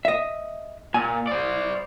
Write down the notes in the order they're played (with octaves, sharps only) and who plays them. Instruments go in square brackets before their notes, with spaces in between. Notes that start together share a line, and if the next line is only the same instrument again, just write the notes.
[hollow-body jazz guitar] D#5 E5
[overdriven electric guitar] A#2 [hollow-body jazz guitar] G#5
[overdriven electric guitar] C5 D5